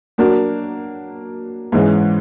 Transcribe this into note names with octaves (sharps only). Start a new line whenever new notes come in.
F#3 A#3 D4 F#4 A#4
G#2 E3 G#3 C#4